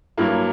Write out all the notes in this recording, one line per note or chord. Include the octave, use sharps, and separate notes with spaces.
G2 F#3 A#3 E4